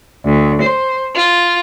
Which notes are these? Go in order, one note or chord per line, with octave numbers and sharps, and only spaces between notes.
D2
C5
F4